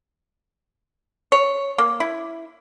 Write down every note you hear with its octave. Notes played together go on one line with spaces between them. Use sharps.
C#5
A#3
E4